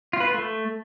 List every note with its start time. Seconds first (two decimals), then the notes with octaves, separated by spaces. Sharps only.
0.13 F4
0.20 B4
0.27 F4
0.34 A3